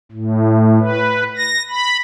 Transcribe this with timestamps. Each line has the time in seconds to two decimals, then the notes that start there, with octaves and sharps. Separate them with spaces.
0.12 A2
0.80 B4
1.36 A#6
1.70 B5